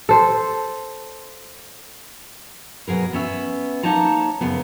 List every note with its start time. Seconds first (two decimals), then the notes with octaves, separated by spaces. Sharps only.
0.09 A4 C5
2.88 B2 F#3 G#4 A#4
3.13 B3 C#4 E5
3.83 A#3 D#4 C#5 A5 A#5
4.41 F#2 C#3 B3